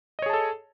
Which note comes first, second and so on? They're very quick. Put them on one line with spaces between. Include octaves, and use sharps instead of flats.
D#5 C#5 G#4 A5 A4